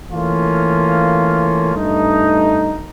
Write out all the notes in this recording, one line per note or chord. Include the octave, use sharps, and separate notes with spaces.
E3 A3 A#3 C#4 F4
G2 A3 D#4